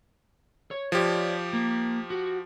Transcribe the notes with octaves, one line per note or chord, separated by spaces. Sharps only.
C#5
F3 G4 C#5 D5
A#3
F#4